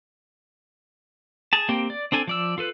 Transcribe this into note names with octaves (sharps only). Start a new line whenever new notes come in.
G#4 A5
A#3 C4 G4
D5
C4 D4 A4 G#5
F3 D5 E6
F4 A4 B4